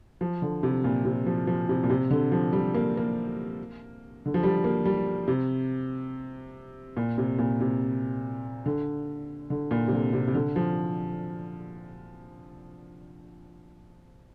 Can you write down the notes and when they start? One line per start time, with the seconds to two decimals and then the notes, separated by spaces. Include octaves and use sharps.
0.21 F3
0.42 D3
0.63 C3
0.84 A#2
1.05 C3
1.26 F3
1.47 F3
1.69 C3
1.83 A#2
1.90 C3
2.10 D3
2.32 F3
2.53 G3
2.74 A#3
2.97 A#3
4.26 D3
4.34 F3
4.43 G3
4.64 A#3
4.85 G3
5.28 C3
6.97 A#2
7.18 C3
7.39 A#2
7.60 C3
8.66 D3
9.50 D3
9.71 A#2
9.88 C3
9.93 D3
10.13 C3
10.28 C3
10.34 D3
10.56 F3